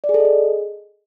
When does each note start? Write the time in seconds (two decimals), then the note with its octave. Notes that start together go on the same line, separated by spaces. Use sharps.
0.04 D5
0.09 G#4
0.14 A4
0.20 D#5
0.25 G#4